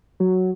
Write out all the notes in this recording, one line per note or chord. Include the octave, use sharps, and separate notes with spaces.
F#3